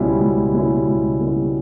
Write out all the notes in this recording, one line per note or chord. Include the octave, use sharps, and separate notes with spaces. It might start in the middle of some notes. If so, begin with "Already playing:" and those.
Already playing: C#2 B2 G3 C#4 E4
C#2
B2 G3 C#4 E4
C#2
B2 G3 C#4 E4